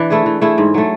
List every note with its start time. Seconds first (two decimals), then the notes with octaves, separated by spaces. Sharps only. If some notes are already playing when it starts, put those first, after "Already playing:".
Already playing: E3 D4
0.10 A3 E4 G#4
0.26 E3
0.41 A3 E4 G#4
0.58 G#2
0.74 F#3 A3